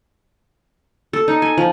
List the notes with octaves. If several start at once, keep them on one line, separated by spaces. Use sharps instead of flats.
A4
D#4
G#5
F3